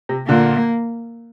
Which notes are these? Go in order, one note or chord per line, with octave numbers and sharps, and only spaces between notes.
C3
A#2 D3 A#3